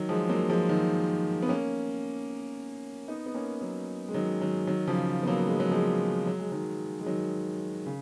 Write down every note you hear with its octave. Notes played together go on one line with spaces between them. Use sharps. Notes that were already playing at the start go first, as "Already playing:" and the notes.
Already playing: D#3 F#3
F3 G#3
F#3 A#3
F3 G#3
D#3 F#3
B3
A#3 C#4
B3 D#4
B3
A#3 C#4
F#3 A#3
G#3
D#3 F#3
D#3 F#3
D#3 F#3
C#3 F3
B3
F#3 A#3
G#3
F#3
F3 G#3
F#3
G#3
D#3 F#3
G#3
D#3 F#3
C#3